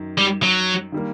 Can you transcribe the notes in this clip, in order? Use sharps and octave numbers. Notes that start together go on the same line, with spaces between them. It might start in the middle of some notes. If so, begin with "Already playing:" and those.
Already playing: F#2 D#3
G3
F#3
D#3 G3 A#3